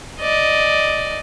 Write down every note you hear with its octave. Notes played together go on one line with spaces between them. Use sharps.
D5 D#5